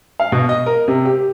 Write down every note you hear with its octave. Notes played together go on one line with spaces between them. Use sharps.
F5
B2
D#5
A#4
C3
G4